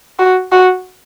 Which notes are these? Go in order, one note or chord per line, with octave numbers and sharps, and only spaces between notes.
F#4
F#4